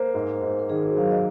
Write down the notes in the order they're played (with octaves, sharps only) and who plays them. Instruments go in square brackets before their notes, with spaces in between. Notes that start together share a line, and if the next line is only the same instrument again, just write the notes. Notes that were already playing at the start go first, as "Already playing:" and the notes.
Already playing: [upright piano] A#3 [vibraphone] C5
[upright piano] G#2
G#2
[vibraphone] A#4
[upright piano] D#3 [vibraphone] G#4
[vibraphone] F#4
[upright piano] F#3 [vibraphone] F5
[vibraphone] D#5